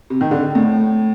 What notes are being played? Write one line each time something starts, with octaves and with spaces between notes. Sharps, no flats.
C3
D#3
D3
A2